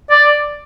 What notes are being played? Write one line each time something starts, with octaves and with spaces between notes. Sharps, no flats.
D5